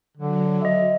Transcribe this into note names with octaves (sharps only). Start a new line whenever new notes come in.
D3 F#3
D#5 E5